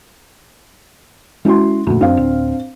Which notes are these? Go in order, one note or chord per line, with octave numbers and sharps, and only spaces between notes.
G#3 C#4 E4 F#4 C6
F1 D2 A#2
F#2 C4 D4 F5
D1